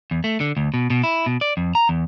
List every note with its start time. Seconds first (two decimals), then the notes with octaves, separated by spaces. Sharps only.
0.11 E2
0.24 A3
0.40 D3
0.57 D2
0.74 B2
0.90 B2
1.03 E4
1.26 B2
1.41 D5
1.57 F2
1.75 A#5
1.89 E2